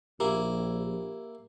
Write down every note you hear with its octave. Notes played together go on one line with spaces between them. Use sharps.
A#1 A#3 E4 G4